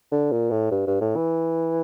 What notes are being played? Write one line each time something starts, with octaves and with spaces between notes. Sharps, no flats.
D3
A#2
A2
G2
G2
A2
E3